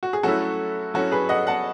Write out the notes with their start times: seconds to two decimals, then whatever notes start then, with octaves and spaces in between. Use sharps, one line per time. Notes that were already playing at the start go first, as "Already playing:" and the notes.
0.03 F#4
0.13 G#4
0.23 F#3 A3 C#4 E4 F#4 A4
0.94 F#3 C#4 E4 F#4 A4
1.11 G#4 B4
1.29 D#5 F#5
1.47 F#5 A5